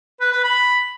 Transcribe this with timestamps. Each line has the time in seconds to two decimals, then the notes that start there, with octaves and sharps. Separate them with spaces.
0.21 B4
0.32 B4
0.44 B5